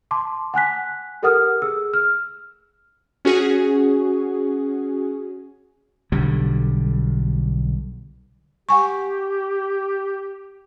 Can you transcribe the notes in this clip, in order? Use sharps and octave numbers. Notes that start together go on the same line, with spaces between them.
A5 C6 D6
F#5 G#5 F#6 B6
G4 A4 A#4 F#5 D#6 F6
G#4 E6
F6
C#4 F#4 G#4
B1 D3 G3
G4 F#5 G#5 C#6